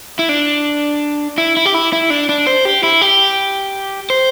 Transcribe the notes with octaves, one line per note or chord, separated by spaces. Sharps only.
E4
D4
E4
E4
G4
E4
E4
D4
D4
C5
G4
E4
G4
C5